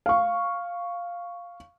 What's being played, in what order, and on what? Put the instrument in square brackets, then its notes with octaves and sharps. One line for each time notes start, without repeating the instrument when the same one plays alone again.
[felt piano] F5 C#6